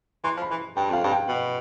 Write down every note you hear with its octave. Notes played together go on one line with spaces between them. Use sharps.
E3 C6
F3
B5
E3
G2 G5
F2 F5
G2
G5
B2